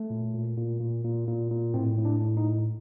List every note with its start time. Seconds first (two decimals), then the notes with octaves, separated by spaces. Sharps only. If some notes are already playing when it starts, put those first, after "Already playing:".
Already playing: A3
0.10 A#2
0.34 A#2
0.57 A#2
0.80 A#2
1.04 A#2
1.27 A#2
1.51 A#2
1.74 A2 C4
1.97 A2
2.05 D4
2.20 A2
2.37 D#4
2.44 A2